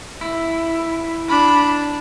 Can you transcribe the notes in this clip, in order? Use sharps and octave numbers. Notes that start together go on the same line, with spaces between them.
E4
D4 B5